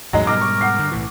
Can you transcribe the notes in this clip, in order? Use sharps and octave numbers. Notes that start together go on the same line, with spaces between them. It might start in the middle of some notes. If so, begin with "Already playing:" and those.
A1 E2 A2 F#3 G#3 D#4
G#2 B2 G3 A#4 D6
C#6
F#5 C7
G2 D3
B1 A2 E3